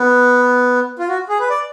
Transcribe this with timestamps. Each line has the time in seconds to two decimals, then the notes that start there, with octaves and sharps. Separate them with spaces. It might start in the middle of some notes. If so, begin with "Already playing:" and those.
Already playing: B3
0.99 F4
1.09 F#4
1.29 G#4
1.40 B4
1.50 D5